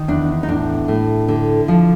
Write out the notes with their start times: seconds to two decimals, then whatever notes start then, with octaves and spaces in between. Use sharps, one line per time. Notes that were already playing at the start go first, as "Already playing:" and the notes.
Already playing: D#3
0.08 E2 D4
0.43 D#4
0.48 A2 D4
0.88 A2
1.28 D3
1.68 F3